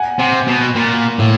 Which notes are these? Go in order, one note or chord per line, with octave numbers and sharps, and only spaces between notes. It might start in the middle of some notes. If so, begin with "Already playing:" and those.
Already playing: F#5 G#5
C3
B2
A#2
A2